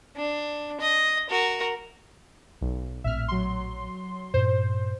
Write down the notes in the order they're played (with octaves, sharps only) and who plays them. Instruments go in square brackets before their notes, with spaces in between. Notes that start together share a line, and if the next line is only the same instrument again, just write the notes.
[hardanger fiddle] D4
D#5
F#4 A#4
[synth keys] B1
[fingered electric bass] A#1 A2 C4 [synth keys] E5 F6
[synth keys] F#3 C6
[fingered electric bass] G2 A#2 [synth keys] C5